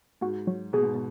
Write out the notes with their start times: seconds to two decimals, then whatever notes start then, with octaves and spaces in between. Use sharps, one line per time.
0.21 G#2 F#4
0.47 F#3
0.73 B2 G#4
0.83 G#2
0.94 B2